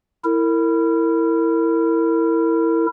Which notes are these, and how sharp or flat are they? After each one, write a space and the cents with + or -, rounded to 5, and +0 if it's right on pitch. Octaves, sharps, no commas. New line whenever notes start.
E4 +0 A#4 -30